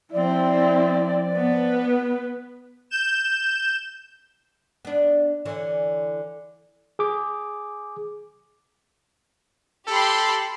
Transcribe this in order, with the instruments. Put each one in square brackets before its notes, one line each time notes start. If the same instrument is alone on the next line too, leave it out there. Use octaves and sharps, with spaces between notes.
[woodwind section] F3 D5 [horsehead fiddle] C4 E4
[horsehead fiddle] B3 B4
[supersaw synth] G6 E7
[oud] B3 D4
D3 E3 C#5
[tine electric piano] G#4 D6
[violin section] G4 B5 C6 [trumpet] A4